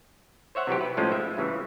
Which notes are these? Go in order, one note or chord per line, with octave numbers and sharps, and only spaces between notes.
C5 C#5 E5 F#5
C3 E3 F#3 G4
B4
A2 F3 G#3 C#4 F4
E5
G2 C#3 E3